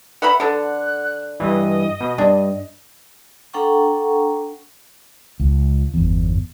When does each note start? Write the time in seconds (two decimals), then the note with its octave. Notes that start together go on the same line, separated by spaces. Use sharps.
0.22 B4 E5 F#5 B5
0.40 D3 A4 F#6
1.40 G2 E3 D#5
2.01 B2
2.18 G2 D4
3.54 D4 A4 F#5 G5 A#5 C#6
5.40 C#2
5.94 G1 E2